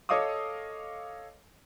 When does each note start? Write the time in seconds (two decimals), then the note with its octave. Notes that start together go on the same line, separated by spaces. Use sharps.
0.09 A4 C#5 D#5 F5 D6 D#6